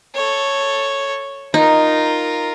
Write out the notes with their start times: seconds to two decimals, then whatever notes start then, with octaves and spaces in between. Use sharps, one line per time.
0.15 A4 C#5
1.54 D#4 F4 A#4